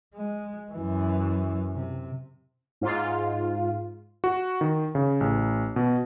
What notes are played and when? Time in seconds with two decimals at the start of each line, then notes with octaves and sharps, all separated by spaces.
0.15 G#3
0.73 F#2 E3
1.75 C3
2.81 G#2 F4
4.24 F#4
4.61 D#3
4.95 C#3
5.21 A1
5.76 B2